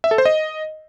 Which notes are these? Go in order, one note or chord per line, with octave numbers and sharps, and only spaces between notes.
E5
A4
C5
D#5